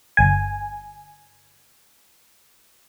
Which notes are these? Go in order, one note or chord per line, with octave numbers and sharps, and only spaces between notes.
G1 G#5